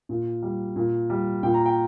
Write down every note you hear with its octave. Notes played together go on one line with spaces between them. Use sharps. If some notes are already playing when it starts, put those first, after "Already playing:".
A#2
G3
A#2
G3
A#2 G5
A#5
G5